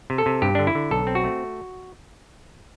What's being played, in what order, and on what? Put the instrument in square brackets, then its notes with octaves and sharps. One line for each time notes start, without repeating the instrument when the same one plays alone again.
[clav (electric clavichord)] C3
A4
C3
G2 G4
D3 D4
E4
D3
B1 A4
C4
F#4
A3